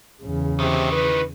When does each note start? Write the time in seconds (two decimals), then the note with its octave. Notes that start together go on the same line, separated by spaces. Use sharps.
0.23 E2 C#3
0.60 C3 D#3 E3
0.92 B4